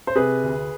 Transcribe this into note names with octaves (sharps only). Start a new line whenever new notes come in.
C5
C3 G#4 B4
D2